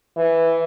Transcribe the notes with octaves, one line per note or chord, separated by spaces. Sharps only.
E3